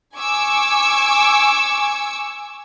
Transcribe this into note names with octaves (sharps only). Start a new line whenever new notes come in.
G#5 C#6 D6 E6